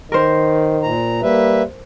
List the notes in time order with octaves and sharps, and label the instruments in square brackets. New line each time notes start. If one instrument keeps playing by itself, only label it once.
[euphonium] D#3 [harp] A#4 C5
[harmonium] A#2 A#5
[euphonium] G3 [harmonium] A#3 B4 E5